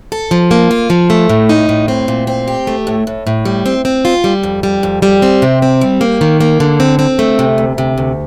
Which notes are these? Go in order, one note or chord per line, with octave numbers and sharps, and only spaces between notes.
A4
F3
A#3
F4
F3
A3
A2
D#4
A2
C4
A#2
C4
G4
A3
A2
A2
A2
G3
C4
C4
F4
G3
F2
G3
F2
G3
C4
C3
C4
G3
A#3
D#3
A#3
D3
C4
C4
A3
C3
D2
C3
D2